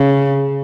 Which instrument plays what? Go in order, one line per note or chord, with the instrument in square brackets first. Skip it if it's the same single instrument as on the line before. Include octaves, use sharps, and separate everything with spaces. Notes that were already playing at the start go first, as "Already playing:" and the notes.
Already playing: [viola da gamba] C#3